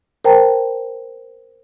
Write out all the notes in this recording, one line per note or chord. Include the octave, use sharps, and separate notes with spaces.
A#4 C5 G5 A5 A#5